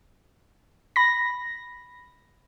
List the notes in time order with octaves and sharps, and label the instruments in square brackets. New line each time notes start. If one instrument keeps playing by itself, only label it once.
[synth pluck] B5 A#6